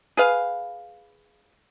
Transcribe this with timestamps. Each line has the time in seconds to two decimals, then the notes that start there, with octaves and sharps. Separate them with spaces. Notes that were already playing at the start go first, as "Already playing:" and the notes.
0.17 G#4 B4 F5